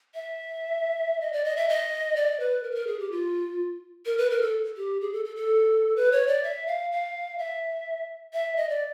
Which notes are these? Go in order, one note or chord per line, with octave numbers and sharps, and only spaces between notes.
E5
D#5
D5
D#5
E5
D#5
D5
B4
A#4
B4
A#4
G#4
G4
F4
A#4
B4
A#4
A4
G4
G#4
A4
A4
A4
B4
C#5
D5
E5
F5
F5
E5
E5
D#5
D5